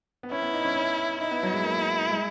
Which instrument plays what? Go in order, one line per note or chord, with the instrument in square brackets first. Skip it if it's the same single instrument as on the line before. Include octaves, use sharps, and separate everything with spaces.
[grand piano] B3
[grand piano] C#4 [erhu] E4
[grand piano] B3
D#4
C#4
C#4
[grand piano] D#4 [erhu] E4
[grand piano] B3
F#3
G#3
A#3
G#3